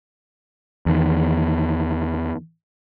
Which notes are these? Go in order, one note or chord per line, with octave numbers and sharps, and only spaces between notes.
E2 D#3